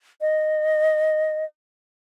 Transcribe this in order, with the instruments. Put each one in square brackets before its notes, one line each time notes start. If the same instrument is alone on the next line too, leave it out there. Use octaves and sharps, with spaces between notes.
[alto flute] D#5